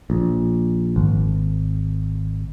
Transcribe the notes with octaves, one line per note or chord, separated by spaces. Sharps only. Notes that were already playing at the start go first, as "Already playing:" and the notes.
A#1
G#1